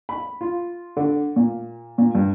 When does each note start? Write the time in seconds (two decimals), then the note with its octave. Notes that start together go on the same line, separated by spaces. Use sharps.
0.09 B5
0.41 F4
0.97 D3
1.36 A#2
1.98 A#2
2.15 G2